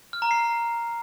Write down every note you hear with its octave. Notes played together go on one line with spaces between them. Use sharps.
F6
A#5
C7